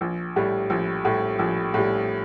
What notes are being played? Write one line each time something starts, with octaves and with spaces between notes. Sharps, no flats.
A#1
A2 G3
A#1
A2 G3
A#1
A2 G3